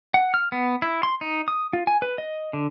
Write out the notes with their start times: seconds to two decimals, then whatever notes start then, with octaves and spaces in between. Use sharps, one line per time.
0.14 F#5
0.34 F6
0.52 B3
0.82 E4
1.03 C6
1.21 D#4
1.48 D#6
1.73 F4
1.87 G#5
2.02 B4
2.18 D#5
2.53 D3